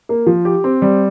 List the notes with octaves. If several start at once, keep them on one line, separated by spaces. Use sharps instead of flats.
A#3
F3
G4
C4
G3